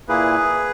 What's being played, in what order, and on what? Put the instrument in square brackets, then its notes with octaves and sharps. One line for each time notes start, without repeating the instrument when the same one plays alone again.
[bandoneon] A#2 A#3 E4 G#4 B4